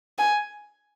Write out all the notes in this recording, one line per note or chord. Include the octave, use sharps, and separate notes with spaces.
G#5